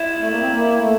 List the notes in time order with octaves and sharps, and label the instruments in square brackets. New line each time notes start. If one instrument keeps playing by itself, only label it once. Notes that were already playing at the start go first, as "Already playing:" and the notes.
Already playing: [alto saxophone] E4
[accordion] A3
A#3
C4
A#3
A3